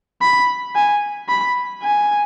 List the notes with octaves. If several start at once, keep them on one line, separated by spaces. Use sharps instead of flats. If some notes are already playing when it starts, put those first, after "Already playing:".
B5
G#5
B5
G#5